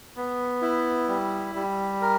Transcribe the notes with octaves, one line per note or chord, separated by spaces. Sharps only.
B3
E4
G3
G3
A#4